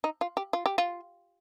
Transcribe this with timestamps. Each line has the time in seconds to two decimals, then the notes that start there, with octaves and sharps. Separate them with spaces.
0.04 D#4
0.21 F4
0.37 G4
0.53 F4
0.66 G4
0.78 F4